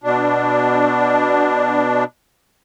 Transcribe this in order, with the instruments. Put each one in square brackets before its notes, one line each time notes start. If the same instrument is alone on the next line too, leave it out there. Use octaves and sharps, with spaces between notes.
[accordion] B2 D4